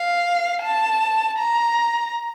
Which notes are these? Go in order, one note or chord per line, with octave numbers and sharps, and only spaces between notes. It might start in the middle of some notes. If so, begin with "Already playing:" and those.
Already playing: F5
A5
A#5